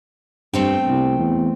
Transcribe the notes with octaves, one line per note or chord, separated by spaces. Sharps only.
G2 A3 C4 G5
C2
E2